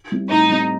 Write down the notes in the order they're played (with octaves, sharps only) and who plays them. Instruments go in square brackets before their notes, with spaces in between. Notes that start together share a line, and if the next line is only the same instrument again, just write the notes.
[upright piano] G3 C4 E4
[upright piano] A2 [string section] D#4
[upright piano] G3 C4 E4